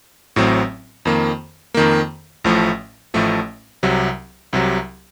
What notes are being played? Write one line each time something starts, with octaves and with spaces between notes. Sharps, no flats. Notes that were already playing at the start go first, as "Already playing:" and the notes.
A1 A2 F#3 C4
F2 D#3 A#3
F2 D#3 A#3
A1 A2 F3 A3
A1 A2 F3 A3
C2 C3 F#3
C2 C3 F#3